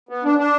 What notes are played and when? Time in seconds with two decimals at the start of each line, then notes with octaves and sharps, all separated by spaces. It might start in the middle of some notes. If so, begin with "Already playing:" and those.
0.09 B3
0.24 D4
0.38 D4